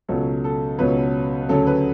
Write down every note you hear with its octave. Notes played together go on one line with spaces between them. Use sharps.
C#2 B2 F#3 C#4 A4
A4
C#2 B2 F#3 C#4 B4
D2 C#3 F#3 C#4 A4
B4